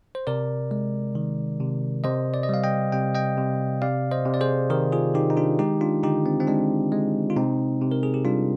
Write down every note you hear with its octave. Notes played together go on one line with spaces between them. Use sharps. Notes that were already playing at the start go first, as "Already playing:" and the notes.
C5
C3 A#4 D5
G#3
D#3
C3
C3 C5 D#5
D5
D#5
G3 F5
D#5 G5
C3 G5
D#5 G5
C3
C3 D5 F5
C5 D#5
C3
D5
G#4 C5
D#3 G4 A#4
F4 G#4
D#3 D#4 G4
D#4
D4 F4
G#3 D#4 G4
D4 F4
D3 D#4 G4
C4
C4
G#3 D4
G#3
F4
C3 C4 D#4
C3
A#4
G#4
G4
G3 D4 F4